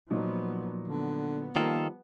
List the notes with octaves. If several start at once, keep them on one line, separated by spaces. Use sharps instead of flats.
A#2 F3 F#3 B3 D#4
D3 B3
D#3 F3 G3 A#3 F4 A4